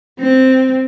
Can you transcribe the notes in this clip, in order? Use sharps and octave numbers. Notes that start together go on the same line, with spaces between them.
C4